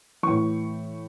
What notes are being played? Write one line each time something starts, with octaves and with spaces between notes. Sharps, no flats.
A2 E3 C#6